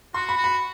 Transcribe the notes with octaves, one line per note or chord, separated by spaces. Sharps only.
F#4 C6
B5
F#4
B5